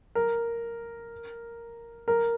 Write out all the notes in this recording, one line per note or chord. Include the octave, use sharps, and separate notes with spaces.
A#4
A#4